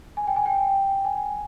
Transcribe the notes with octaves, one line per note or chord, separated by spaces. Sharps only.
G#5
G5
G#5
G5
G#5